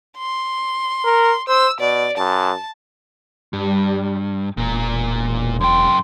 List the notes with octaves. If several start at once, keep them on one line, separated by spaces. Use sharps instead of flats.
C6
A#4
C5 E6
B2 D5
F#2 A5
G2 G3
E1 A#2 A#4
F#2 G5 C6